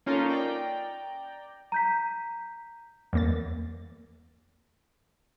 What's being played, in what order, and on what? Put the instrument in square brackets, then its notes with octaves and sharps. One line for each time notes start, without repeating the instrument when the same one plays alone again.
[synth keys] A#3 C#4 D#4 F4 A4 A#4
D5 G5 A#5
[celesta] A#5 G6 B6
[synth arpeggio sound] E2 A#3 A6